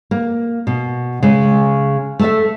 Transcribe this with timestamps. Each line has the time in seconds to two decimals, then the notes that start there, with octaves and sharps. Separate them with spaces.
0.11 A#3
0.67 B2
1.22 C#3 G#3
2.19 A3 A4 E5